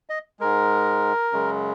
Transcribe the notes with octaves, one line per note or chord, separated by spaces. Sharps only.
D#5
G#2 G#3 A#4
F#2 C#3 G#3